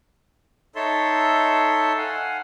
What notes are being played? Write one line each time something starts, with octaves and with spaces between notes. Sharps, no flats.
D#4 A4 C#5 E5 A5 C6
F5 F#5 G#5